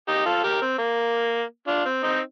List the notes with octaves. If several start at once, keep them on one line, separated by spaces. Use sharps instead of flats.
D#4 G4
F4 A4
G4 A#4
C4
A#3
D4 F4
C4
C4 D#4